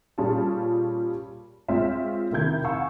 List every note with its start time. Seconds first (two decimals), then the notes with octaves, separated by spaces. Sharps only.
0.18 A#2 G3 C#4 F4 G#4 A5
1.68 G#3 C4 F4 C#5 E5
2.32 C3 D#3 E4 A#4 G6 G#6
2.64 F5 F#5 G#5 C#6 E6